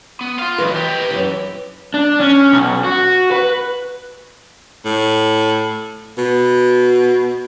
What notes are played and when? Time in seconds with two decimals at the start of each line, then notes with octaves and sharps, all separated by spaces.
0.21 B3
0.39 F4 F5
0.58 E3 F#3 B4 D#5
0.76 G4 A#4
1.11 F#2 E3
1.94 D4
2.20 C#4
2.52 B1
2.84 F#4
3.31 B4
4.85 A2
6.18 B2